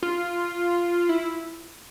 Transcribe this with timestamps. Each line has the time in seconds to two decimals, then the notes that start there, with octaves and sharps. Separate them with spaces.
0.03 F4
1.09 E4